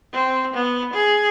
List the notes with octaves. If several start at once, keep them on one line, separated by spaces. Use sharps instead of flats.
C4
B3
G#4